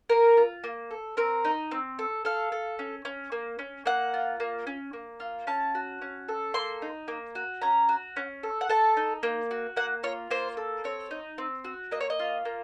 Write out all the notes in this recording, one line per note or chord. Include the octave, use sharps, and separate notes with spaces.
A#3 A#4
F4
A#3
A4
C4 A#4
D#4
C4
A4
A4 F5
A4
C#4
C#4
A#3
C#4
A#3 F#5
F4
A#3
C#4
A#3
F4
C#4 A5
F#4
C#4
A4
A#3 C6
D#4
A#3
F#4
C#4 A#5
F#4
C#4
A4
F#5
A4 A5
D#4
A#3
F#4
A#3 F#5
F4 C#5
A#3 C5
A4
C4 C#5
D#4
C4
F#4
A#3 D#5
C#5
D#5
F4
A#3